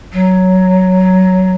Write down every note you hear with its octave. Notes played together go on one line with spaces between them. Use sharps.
F#3